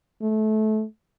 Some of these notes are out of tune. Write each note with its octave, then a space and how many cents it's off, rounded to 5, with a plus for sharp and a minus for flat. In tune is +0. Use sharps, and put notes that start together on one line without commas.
A3 -25